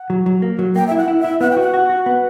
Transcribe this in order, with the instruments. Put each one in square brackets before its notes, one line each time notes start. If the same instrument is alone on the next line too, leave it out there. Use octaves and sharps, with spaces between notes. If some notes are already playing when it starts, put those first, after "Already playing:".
Already playing: [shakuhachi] F#5
[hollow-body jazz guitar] F#3
F#3
A#3
F#3
[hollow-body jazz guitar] A#3 [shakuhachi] G5
[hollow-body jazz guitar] E4 [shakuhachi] E5
[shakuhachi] F#5
[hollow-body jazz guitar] E4
[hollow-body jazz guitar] E4 [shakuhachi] E5
[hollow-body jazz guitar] B3 [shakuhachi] F#5
[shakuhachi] G5
[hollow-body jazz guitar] F#4 [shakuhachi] F#5
[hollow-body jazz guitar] F#4
F#4
B3